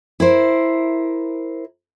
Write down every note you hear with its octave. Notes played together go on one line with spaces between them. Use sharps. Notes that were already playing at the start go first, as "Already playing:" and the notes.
E4 A#4 C5